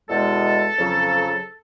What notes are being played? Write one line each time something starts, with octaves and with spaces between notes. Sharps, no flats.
E2 B2 G#3 A4
F2 C#3 F#3